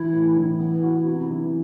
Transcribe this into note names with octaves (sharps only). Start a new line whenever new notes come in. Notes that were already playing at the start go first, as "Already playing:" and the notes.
Already playing: E3 E4
A2
E3
B3 E4
F#4
C3
E3